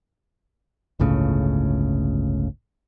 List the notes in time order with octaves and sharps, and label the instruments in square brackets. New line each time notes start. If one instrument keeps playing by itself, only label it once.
[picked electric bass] G1 C#2 A2 C#3